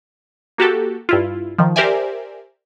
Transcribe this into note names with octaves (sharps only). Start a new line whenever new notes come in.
A#3 F#4 G4 A4
G2 E4 F4
D#3 F3
G4 A#4 C5 D5 E5 G#5